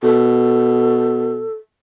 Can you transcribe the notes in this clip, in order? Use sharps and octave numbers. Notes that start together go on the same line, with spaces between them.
B2 A4